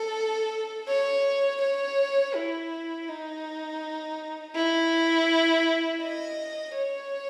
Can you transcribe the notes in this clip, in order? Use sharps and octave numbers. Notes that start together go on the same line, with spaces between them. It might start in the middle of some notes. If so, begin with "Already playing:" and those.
Already playing: A4
C#5
C#5
E4
D#4
E4
D#5
C#5